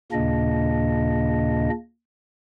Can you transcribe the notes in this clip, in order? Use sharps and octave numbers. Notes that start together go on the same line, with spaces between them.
D#2 A#2 C#3 A#3 D4 D#5